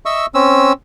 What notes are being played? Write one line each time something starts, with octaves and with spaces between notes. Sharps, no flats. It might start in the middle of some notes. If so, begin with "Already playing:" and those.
D#5 E5 C#6 E6
C4 C#4 E6